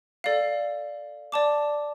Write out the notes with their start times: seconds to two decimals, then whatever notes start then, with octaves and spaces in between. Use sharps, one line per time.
0.24 A4 D5 F5
1.32 D5 A5 D6